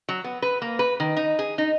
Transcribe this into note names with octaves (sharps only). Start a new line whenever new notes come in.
F#3
B3
B4
A#3
B4
D#3
D#4
G#4
D#4